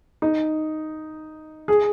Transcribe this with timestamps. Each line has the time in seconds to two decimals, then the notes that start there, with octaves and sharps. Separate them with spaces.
0.22 D#4
1.68 G#4